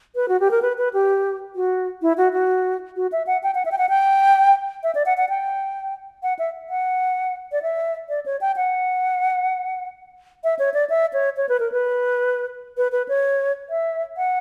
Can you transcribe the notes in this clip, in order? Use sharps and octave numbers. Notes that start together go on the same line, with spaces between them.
B4
F#4
G4
A#4
B4
B4
G4
F#4
E4
F#4
F#4
F#4
E5
F#5
G5
F#5
E5
G5
F#5
G5
E5
D5
F#5
F#5
G5
F#5
E5
F#5
D5
E5
D5
C#5
G5
F#5
E5
C#5
D5
E5
C#5
C#5
B4
A#4
B4
B4
B4
C#5
E5
F#5